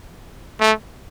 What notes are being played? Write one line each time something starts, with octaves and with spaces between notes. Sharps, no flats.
A3